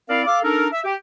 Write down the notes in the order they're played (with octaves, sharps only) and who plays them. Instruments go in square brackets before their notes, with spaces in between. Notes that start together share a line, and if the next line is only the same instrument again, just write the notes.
[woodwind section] C4 E4 A#4 D5 F5
A4 F5 D6
D4 D#4 A4 A#4
E5
G4